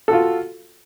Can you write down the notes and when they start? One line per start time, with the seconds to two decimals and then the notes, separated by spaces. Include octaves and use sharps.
0.08 A4
0.10 F#4
0.13 F4